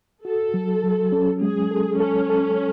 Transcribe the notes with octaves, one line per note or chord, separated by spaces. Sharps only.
F#4 A4
F#3
F#3
C#4
G#3 G#4
A4
C#4 A4
A4